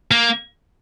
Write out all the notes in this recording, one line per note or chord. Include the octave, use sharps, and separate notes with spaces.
A#3